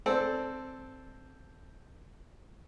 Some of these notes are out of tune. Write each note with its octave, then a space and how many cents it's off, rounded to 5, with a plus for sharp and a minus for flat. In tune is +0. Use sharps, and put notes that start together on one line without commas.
C4 +0 A4 +0 D5 +0